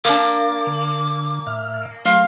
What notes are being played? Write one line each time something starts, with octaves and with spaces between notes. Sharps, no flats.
A#3 D4 D6
D3
A2 E5 F6
F#3 A3 F5 C6